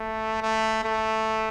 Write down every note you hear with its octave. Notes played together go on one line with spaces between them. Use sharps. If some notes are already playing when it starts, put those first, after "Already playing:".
Already playing: A3
A3
A3